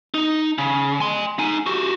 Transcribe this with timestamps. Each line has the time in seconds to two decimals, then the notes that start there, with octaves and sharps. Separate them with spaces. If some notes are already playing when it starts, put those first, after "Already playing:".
0.14 D#4
0.58 C#3
1.00 G#5 C6
1.39 D#4 G#5
1.66 F#4 G4